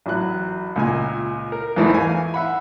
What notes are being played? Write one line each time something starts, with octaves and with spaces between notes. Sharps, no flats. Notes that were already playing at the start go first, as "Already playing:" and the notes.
A1 F#3 F#6
C#2 A#2 G#5
A#4
E2 G#2 E3 A3 D#4
F5 G#5
E5 F#5 B5